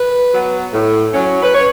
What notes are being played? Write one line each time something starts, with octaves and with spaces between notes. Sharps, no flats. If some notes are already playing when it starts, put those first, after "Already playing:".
Already playing: B4
F#3 B3
A2
F#3 C#4
B4
C#5